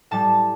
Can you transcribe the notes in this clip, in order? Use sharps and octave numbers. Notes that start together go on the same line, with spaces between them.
A2 G3 A5